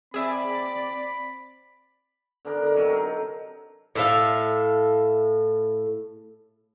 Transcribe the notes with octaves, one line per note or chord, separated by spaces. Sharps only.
C4 G#4 D5 E5 B5
D3 B3 D4 A#4
A#4 D#5
C3 F#3 A#4
D#4 A4
A2 A4 E5 F5